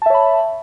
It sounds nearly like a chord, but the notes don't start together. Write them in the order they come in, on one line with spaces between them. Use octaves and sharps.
A5 E5 C#5 B5